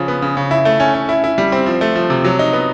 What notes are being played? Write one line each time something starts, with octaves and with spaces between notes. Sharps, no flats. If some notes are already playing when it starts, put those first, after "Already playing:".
Already playing: C#3 F3
B3
C#3
C#3
E4
A3
C#4
C#4
E4
E4
G3
C4
F3
A3
F3
C3
F#3
D#4
B3